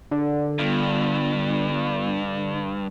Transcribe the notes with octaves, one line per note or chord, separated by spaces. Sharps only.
D3 D5
G2 G3 B3 F4